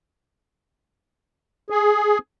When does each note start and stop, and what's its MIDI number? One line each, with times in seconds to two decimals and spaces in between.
1.70 2.18 68